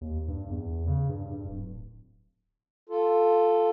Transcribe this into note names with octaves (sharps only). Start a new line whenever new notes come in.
D#2
G2
E2
C#3
G2
G2
D1
F4 A4